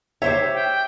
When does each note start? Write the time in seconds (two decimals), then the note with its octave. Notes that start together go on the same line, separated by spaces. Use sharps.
0.22 G4 C5 C#5 E5
0.54 G5